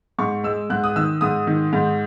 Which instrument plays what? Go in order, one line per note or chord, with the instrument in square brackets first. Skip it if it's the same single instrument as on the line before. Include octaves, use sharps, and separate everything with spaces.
[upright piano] G#2 C#6
G#3 E6
G#2 F#6
D#6
D#3 E6
G#2 D#6
D#3
G#2